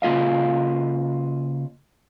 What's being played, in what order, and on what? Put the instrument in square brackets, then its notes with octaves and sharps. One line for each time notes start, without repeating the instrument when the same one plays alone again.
[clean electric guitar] C#3 A#3 F4 D#5 F5